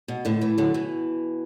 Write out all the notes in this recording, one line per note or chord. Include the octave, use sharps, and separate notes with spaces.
B2
A2 D3
E3 A3
D3 F#3
B2 E3